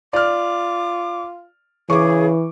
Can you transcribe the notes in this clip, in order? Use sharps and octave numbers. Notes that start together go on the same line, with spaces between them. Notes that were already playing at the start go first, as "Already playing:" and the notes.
F4 D5 D6 F6
C#3 E3 G#4 C#6 D6